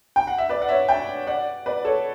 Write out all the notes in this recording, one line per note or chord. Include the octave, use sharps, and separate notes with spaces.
G5
F#5
E5
B4 D5
F#5
C#5 E5
E5 G5
D5 F#5
B4 D5
A4 C#5